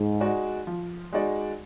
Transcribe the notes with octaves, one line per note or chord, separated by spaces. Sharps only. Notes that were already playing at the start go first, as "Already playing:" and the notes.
Already playing: G#2
G#3 D#4 F#4 D5
F3
G#3 D#4 F#4 D5